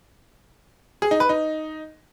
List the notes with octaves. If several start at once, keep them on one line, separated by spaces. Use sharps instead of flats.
G#4
D#4
B4
D#4